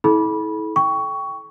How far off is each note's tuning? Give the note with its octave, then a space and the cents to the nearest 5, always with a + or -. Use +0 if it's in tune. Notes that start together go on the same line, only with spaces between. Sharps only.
E4 -35 A4 -35 B5 -20
G5 +0 C#6 +15